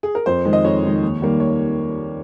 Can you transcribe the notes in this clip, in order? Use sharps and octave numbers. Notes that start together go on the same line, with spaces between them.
G#4
A#4
F2 C5
D#3 G#3
D#5
F2 C#5
D#3 G#3
D#2
D#3 G3 A#3
C#5